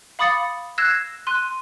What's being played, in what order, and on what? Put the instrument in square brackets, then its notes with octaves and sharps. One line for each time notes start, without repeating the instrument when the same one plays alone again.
[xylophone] F5 B5 D6 D#6 A6 C#7
E6 F#6 G#6 A#6 C7 E7
C6 F#6 D#7